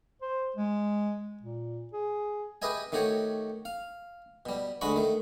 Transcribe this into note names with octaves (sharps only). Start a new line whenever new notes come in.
C5
G#3
A#2
G#4
G4 G#4 B4 D#5 E5 G#5
D#3 A3 F#4 G4 C#5
F5
B2 G3
D2 G#3 F#4 F#5 B5 C#6
D#3 A3